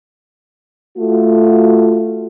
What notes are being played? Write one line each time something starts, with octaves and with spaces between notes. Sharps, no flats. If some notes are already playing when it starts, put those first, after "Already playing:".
A3 F4 F#4